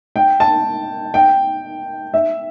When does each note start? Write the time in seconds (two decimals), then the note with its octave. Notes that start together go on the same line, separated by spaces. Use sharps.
0.16 G5
0.40 A5
1.14 G5
2.14 E5